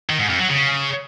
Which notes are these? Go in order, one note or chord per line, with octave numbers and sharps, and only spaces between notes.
D#3
G#2
F2
F#3
C#3